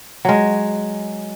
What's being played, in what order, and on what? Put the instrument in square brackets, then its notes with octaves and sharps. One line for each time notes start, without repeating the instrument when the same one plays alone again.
[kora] F#3 G#3